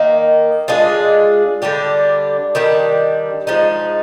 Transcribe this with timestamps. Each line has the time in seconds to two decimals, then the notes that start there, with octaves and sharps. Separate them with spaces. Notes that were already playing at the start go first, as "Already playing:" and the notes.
Already playing: D#3 A#3 D#4
0.68 G#3 D4 F4 G#4
1.62 D3 G3 D4 G4
2.55 D#3 G3 D4
3.47 F3 G#3 D#4